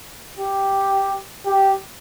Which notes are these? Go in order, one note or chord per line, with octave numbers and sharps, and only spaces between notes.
G4
G4